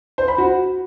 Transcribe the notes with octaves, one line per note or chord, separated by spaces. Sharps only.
C5
B5
F#4